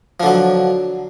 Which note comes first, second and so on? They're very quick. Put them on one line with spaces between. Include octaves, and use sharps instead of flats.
F3 D3 F#3